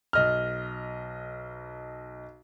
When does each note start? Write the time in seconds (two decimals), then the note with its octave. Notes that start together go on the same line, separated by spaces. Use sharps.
0.13 B1 D#5 F6